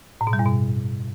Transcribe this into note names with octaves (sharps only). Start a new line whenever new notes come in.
A2
B2
G3
G2
B2